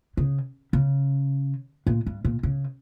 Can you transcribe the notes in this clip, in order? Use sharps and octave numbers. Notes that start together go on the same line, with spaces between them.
C#3
C#3
A#2
G2
A#2
C#3